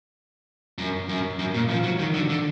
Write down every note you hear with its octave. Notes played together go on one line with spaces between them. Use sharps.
F#2
F#2
F#2
A#2
F3
F#3
D#3
D3
D3